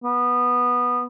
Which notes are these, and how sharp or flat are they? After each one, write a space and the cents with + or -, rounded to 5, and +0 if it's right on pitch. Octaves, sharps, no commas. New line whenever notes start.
B3 -10